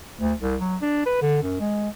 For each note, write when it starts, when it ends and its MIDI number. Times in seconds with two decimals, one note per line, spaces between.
0.20 0.33 38
0.41 0.55 36
0.61 0.76 54
0.82 1.05 62
1.06 1.18 71
1.22 1.40 50
1.43 1.57 42
1.60 1.89 56